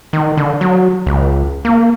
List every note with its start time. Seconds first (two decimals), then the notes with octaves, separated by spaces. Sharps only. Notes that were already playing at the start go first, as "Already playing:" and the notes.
0.13 D#3
0.37 D3
0.61 F#3
1.07 C#2
1.65 A#3